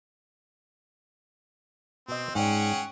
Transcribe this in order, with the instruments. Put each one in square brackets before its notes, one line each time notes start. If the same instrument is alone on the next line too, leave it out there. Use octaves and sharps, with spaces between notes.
[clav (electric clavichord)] B2 D#5 [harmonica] C4
[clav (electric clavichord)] G#2 D5 [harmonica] C#4 G#4 F#5 [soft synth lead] G5